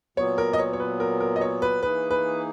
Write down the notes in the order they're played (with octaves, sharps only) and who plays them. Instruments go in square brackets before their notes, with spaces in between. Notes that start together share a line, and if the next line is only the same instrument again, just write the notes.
[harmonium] A#2 F#3 B3 [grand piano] C#5
[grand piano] A#4
D#5
C#5
C#5
B4
A#4
A#4
D#5
C#5
B4
[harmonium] E3 A#3 D#4 G#4 [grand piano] B4
[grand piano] B4